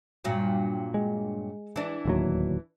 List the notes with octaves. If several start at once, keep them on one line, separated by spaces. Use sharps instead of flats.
G2 A#2 F#3
G#3
E3 D4
D1 D#2 F#3